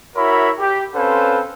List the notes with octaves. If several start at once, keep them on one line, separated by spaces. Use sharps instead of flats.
E4 F#4 A#4 C#5 E5 B5
G4
C4 C#4 A4 B4 C5 F5